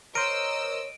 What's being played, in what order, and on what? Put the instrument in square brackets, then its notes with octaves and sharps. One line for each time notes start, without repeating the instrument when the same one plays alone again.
[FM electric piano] A#4 C5 [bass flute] C#5 [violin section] D#5 E6 [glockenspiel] D7 D#7